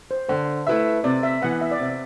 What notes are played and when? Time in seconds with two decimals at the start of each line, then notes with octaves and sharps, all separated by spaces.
0.11 C5
0.29 D3 C5
0.67 A3 E4 B4 E5
1.04 C3 D5
1.23 E5
1.42 E3 B3 F#5
1.61 E5
1.71 D5
1.79 C3 E5